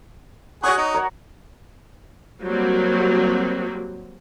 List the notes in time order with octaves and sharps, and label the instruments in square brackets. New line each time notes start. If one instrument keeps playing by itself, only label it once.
[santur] F#4 C#5 D#6 [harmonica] G#4 F#5 C#6
[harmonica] D#4 [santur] F#5
[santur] A#4 C#5 F#5
[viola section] F#3 G3 A#3 C4 F#4